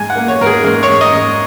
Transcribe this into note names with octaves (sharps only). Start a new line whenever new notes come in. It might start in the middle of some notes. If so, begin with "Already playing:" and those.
Already playing: G#2 G#5
F#5
A#3
C#5
G#2 A#4
G#4
G#2 A#4
C#5
G#2
D#5
G#2